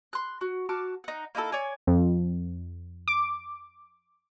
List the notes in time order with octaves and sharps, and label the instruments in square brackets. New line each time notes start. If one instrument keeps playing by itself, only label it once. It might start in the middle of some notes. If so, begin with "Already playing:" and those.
[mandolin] C6 F#6
F#4
F#4 A5 D6 F6
D#4 F#5
A#3 D#4 E4 A4
C#5 D5 G#5
[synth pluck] F2
D6